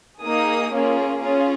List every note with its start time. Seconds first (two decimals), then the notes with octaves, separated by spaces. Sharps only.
0.24 A#3 D#4 G#4 D#6
0.73 A#3 C#4 F4 G#4
1.22 C#4 F4 G#4